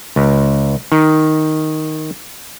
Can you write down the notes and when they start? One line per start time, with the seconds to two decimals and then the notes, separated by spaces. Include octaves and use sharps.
0.16 C#2
0.92 D#3